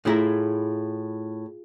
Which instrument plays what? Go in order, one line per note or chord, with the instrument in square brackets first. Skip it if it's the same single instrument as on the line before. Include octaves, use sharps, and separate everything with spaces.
[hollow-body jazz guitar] A2 E4 A#5 [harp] F4 G#4 E5